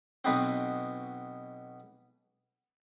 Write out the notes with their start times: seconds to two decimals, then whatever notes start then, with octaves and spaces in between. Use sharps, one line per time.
0.25 B1 B2 B3 C4